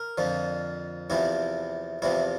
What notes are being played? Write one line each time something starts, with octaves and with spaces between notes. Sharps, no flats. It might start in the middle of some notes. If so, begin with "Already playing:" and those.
Already playing: A#4
F2 D3 F3
E2 C3 F3 E4
E2 C3 F3 E4